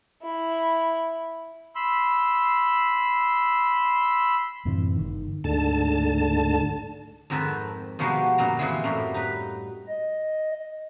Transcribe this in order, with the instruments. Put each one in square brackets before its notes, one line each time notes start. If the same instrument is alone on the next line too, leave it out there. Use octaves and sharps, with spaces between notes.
[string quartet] E4
[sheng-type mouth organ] B5 C6 E6
[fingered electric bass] F#2 A2 C3 E3
G1 D#3
[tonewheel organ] D2 G#2 D3 A5
[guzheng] F2 G#2 D#3 C4 B4 A5
B2 F3 G3 G#3 D#4 F#4
F#2 A#2 G3 A#5
A#2 E3 F3 C4 E4 G#4
F#2 A2 G3
D#4 B4
[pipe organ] D#5